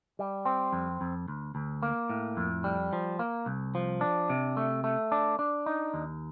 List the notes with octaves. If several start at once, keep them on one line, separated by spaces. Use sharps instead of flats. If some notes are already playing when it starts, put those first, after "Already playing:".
G3
C4
F2
F2
D2
D2
A#3
A2
F2
G3
F3
A#3
C2
F3
D4
C3
A3
A3
D4
D4
D#4
D#2